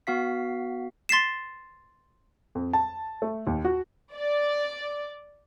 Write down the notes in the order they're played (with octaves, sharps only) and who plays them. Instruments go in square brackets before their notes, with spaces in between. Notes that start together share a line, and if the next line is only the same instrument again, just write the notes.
[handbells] B3 F#4 F5 B6
[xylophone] C6 A6 B6 C7 E7
[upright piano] F2
A5
A3
D#2
F#4
[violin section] D5